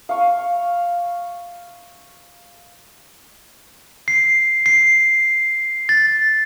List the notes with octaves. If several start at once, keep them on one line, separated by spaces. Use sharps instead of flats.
F5 C#6
C7
C7
A6